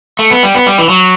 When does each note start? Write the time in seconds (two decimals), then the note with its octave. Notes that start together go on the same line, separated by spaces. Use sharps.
0.19 A3
0.31 B3
0.43 G3
0.55 B3
0.67 G3
0.78 E3
0.89 F#3